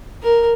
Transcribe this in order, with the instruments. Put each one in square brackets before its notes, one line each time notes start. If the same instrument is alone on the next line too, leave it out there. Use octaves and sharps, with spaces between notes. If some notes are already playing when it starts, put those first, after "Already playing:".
[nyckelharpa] A#4